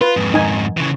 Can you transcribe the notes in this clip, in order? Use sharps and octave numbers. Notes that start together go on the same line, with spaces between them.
F4 B4
F2 G#2
D#4 G#5
C#3 E3